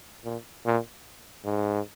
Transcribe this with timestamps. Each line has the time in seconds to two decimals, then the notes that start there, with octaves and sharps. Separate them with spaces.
0.25 A#2
0.66 A#2
1.44 G#2